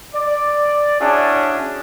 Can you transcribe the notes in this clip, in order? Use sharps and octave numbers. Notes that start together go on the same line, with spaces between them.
D5
C#4 D4 E4 F#4 G#4